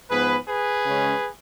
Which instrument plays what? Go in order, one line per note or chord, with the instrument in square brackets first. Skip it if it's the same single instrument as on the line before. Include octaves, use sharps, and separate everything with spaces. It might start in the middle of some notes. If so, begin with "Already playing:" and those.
[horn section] G#2 F3 B3 G#4 B4
G#4 B4
C#3 G#3 C#4